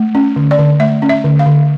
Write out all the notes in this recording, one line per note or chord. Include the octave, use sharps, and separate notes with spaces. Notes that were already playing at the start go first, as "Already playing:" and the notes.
Already playing: A3
C#4
D3
D5
D3
A3 E5
C#4
E5
D3
F5
D3